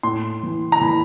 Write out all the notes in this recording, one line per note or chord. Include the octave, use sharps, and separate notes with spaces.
A2 C6
E3
A#5
E3 B5